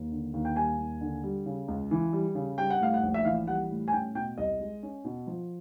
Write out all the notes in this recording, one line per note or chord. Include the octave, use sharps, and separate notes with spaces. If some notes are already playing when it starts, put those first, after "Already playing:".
Already playing: D#2
D3
D#2
G5
G3 G#5
D#2
D3
G3
C#3
C#2
E3
G3
C#3
G3 G5
F#5
A2 F5
F#5
A#1
E5
E3 F5
G3 F#5
A2
G#5
C#4 G5
B2 G5
C2 D#5
G#3
C#4
B2
F3